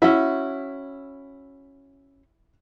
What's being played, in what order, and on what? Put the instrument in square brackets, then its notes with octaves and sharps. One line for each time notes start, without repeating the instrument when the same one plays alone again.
[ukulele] C#4 F#4 [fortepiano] E4 E5